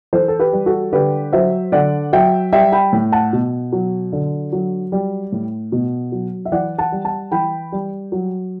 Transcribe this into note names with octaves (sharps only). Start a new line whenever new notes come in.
E3 A4 C5
A4
G4 B4
G3
F#4 A4
D3 G4 B4
F#3 C5 E5
D3 D5 F#5
F#3 E5 G5
G3 E5 G5
G5 B5
A2
F#5 A5
B2
F#3
D3
F#3
G3
A2
B2
F#3
E5
E3 D5 F#5
F#5 A5
G3
F#5 A5
E3 G5 B5
G3
F#3